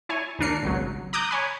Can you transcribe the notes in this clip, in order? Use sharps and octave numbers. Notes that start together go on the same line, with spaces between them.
E4 C#5 G#5
D#2 D#3 D4 A#4 C7 C#7
G#1 C#2 F#3
A#5 D6 D#6 F#6 G6
C#5 G#5 B5